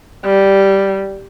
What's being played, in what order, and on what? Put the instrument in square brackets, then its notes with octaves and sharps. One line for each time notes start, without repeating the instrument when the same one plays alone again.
[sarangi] G3